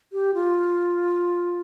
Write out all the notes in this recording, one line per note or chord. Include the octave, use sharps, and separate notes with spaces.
G4
F4